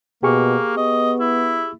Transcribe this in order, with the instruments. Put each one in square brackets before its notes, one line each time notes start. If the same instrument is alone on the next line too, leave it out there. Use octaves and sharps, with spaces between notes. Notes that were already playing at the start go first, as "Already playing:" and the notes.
[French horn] B2 [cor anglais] A#3 [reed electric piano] G4 G#4 C#6
[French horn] B3 [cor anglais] D#5
[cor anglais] E4